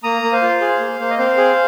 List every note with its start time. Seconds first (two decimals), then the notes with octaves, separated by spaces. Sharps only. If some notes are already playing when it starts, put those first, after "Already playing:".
0.03 A#3 A#5 D#6
0.23 A#3
0.32 C5 F5
0.42 F4
0.61 G#4
0.80 A#3
0.99 A#3 C5
1.10 D#5
1.18 C4 C5 F5
1.38 G#4